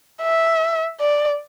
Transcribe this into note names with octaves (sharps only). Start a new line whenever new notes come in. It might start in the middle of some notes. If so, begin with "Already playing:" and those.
E5
D5